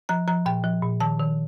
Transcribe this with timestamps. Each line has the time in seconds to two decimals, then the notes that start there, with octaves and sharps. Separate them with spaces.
0.09 F3 A#5
0.28 F3 A#5
0.46 A#2 G5
0.64 F3
0.82 A#2
1.00 D#3 A5
1.20 D#3